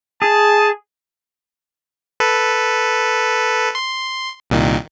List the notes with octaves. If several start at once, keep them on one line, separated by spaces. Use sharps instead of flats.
G#4 A5
A4 B4
C6
C2 A#2 D#3